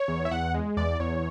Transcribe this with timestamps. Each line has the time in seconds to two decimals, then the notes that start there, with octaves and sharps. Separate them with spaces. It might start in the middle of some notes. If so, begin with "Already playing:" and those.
Already playing: C#5
0.08 E2
0.25 E5
0.31 E2 F#5
0.54 G#3
0.77 E2 D5
1.00 E2 C#5